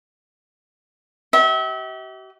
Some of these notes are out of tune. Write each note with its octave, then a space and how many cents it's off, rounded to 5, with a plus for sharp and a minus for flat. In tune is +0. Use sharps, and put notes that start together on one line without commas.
G4 -45 E5 -35